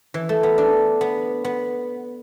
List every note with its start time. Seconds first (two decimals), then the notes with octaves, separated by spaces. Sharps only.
0.14 E3
0.29 A3
0.43 B3
0.58 D4
1.01 B3
1.44 B3